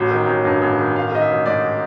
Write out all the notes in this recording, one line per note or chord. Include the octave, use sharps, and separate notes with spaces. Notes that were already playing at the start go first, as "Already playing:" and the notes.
Already playing: A1 F#3
D#3
A1
G2
A1
D#3
A1 F5
D#3 D#5
E5
A1
G#2 D5